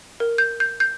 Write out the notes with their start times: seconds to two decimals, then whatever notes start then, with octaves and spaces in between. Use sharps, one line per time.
0.20 A#4
0.38 G6
0.60 G6
0.80 G6